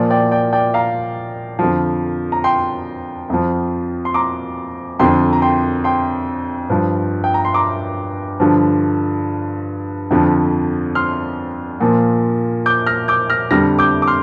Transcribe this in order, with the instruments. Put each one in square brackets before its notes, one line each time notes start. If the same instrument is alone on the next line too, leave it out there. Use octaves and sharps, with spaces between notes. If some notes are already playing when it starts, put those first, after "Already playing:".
Already playing: [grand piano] A#2 F3 D5
D5 G5
D5 G5
D5 G5
F5 A#5
F2 D3 F3
A#5
G5 C6
F2 F3
C6
A#5 D6
F2 D3 F3 G5 C6
A#5
G5 C6
G5 C6
G2 F3
G5
A#5
C6
A#5 D6
G2 D3 F3
F2 D3 F3
C6 F6
A#2 F3
D6 G6
F6 A#6
D6 G6
F6 A#6
F2 D3 G3 F6 A#6
D6 G6
D6
C6 F6